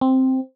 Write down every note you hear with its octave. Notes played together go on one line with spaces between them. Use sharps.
C4